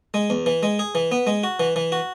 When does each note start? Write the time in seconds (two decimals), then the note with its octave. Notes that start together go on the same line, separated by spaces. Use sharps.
0.14 G#3
0.30 E2
0.46 E3
0.63 G#3
0.79 G#4
0.95 E3
1.12 B3
1.27 G#3
1.44 F#4
1.60 E3
1.76 E3
1.92 F#4